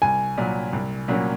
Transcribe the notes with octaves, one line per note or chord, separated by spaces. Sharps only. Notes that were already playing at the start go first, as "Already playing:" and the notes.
C2 G#5
A#2 F#3
C2
A#2 F#3 A#3 C#4